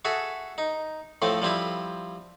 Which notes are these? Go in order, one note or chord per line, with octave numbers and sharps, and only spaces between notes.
F#4 G#4 A4 E5
D#4
A2 F3 A3 C4
F3 G3 C4 E4